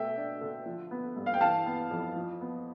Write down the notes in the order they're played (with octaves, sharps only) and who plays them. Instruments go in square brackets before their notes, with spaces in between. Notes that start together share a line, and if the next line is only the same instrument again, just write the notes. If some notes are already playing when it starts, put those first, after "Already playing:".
Already playing: [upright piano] B2 A3 E5 G5
D4
D3
F3
B3
G2
F5
G5
E3 F5 A5
B3
F2
F3
B3